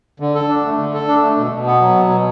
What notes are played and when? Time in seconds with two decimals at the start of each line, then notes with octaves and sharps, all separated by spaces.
0.20 D3
0.35 A4
0.49 D4
0.65 A3
0.79 D3
0.94 A4
1.08 D4
1.22 A3
1.37 B2
1.52 B2
1.66 B3
1.81 F#3
1.95 B2
2.10 B2